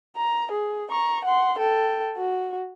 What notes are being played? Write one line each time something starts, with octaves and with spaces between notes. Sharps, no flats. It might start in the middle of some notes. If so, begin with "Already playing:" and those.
A#5
G#4
A#5 C#6
F#5 C6
A4 G5
F#4